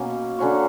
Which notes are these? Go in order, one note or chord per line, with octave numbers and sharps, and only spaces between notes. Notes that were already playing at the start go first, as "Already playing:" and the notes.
Already playing: B2 A#3 C#4
D3 F#3 C#4 F#4